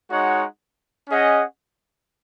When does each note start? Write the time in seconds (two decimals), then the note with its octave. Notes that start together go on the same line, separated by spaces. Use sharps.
0.10 G#3 D#4 F#4 C#5 F#5
1.09 C#4 G#4 D#5 F#5